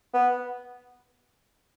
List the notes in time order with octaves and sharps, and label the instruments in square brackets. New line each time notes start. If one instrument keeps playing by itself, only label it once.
[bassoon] B3